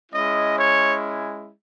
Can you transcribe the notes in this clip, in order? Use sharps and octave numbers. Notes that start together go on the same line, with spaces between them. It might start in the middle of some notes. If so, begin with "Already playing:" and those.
G#3 C#4 E4 D#5
C#5